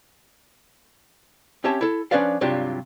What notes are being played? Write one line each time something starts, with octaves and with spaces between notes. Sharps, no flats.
C4 C#4 G4 C#5 E5 A5
E4 A4
F3 C#4 D4 B4 D5 F5
G2 C3 F#3 D4 F4 G4